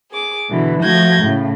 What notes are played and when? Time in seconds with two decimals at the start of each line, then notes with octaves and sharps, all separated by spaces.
0.11 G#4 D6
0.50 B2 D3 E3
0.83 F3 A3 F#4 G6 G#6 A#6
1.23 A2 C#3 A3